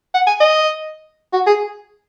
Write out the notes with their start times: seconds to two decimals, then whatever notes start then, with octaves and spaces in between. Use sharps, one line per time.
0.14 F#5
0.27 G#5
0.40 D#5
1.33 F#4
1.47 G#4